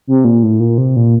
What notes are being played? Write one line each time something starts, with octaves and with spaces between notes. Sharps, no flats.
C3
A#2
A2
A#2
C3
A#2